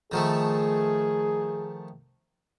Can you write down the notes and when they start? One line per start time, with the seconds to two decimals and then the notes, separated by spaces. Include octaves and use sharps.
0.12 D#3 F3 A3 G#4